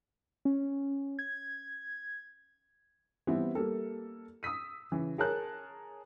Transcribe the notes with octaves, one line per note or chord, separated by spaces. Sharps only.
C#4
G#6
E3 G3 B3 C4 E4
G3 A#3 A4
D#6 E6 B6 D#7
C#3 E3
G#4 A#4 C#5 A5 F#6